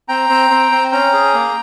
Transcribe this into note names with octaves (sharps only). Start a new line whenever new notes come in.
C4 G5 A#5
C4
C4
C4
C#4 G5 A#5
G#4
A#3